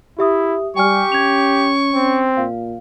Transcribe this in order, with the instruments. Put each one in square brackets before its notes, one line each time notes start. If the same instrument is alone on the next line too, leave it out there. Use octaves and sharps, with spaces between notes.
[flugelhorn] E4 [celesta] G4 E5 D#6
[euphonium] G3 [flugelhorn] G4 [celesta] G5 G#5 F6 [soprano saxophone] C#6
[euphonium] C#4 [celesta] G#6 F7
[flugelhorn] C4
[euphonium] A#2 [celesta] F5